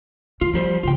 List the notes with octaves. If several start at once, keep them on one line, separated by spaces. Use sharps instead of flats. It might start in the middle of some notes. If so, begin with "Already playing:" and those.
E3 F4
F3 G3 E4 C5
D#1 C#3 F4 G5